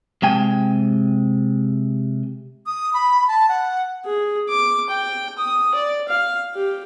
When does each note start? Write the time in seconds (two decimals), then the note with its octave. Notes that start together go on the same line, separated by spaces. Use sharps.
0.22 C3 G#3 G5 G#5
2.66 D#6
2.93 B5
3.28 A5
3.49 F#5
4.05 G#4
4.49 D6
4.89 G5
5.38 D#6
5.74 D5
6.08 F5
6.55 G4